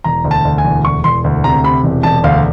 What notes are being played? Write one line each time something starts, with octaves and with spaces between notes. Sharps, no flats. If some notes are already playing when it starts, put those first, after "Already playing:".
E1 A#5
D2
A5
D2
G#5
E1
E1 C#6
E1 C6
D2
C3 A#5
C3 B5
E1
E1 A5
D2 F5